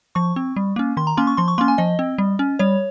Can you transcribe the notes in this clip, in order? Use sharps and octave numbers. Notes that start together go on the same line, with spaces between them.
F3 C#6
C4
G3
A#3 C#4
D#3 C6
A#5
A#3 C#4 C6
C#6
F3 C6
C#6
A#3 C#4 C6
G#5
F3 D#5
C4
G3
C#4
G3 C#5